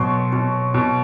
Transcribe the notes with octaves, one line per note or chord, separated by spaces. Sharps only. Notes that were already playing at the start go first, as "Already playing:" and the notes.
Already playing: B2 F#3 C6 C#6
B2
B2